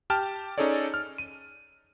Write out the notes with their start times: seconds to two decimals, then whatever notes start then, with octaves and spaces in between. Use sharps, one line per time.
0.10 G4 G5 A5 F6
0.58 C#4 D#4 G#4 A4 C#5 D5
0.94 F6
1.18 D#7